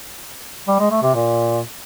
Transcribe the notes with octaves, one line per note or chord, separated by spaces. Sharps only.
G3
G#3
A3
C3
A#2